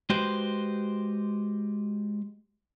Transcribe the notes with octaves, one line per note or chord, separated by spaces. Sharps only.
G#3 F#4 G4 B4 C5